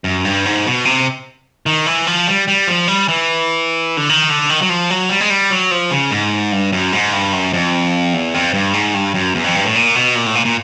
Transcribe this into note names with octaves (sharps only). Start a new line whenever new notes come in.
F#2
G2
G#2
B2
C3
D#3
E3
F3
G3
G3
F3
G3
E3
D3
D#3
D3
D#3
F#3
F3
F#3
G3
G#3
G3
F#3
F3
C#3
G#2
G2
F#2
G#2
G2
F#2
F2
E2
F2
G2
G#2
G2
F#2
E2
F2
G2
A2
A#2
B2
A#2
A2
A#2
A#2